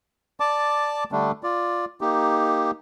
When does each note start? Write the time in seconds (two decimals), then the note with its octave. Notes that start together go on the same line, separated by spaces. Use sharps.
0.40 D5 A5 D6
1.12 D3 G3 A3 D4
1.43 F4 D5
2.01 A#3 D#4 G4